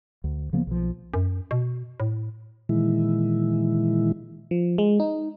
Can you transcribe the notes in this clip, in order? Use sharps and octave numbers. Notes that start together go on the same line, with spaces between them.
D2
C#3 F3 A#3 B3
B1 F3
F#2
B2
A2
A#2 D#3 E3 G#3 E4
F3
G#3
D#4